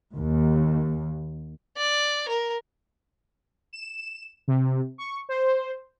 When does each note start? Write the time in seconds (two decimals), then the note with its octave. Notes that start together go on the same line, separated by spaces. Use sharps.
0.15 D#2
1.77 D5
2.28 A#4
3.73 E7
4.48 C3
4.98 C#6
5.29 C5